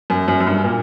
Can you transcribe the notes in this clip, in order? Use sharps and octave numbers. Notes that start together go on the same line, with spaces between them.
F#2
F#2
F#2
G2
A#2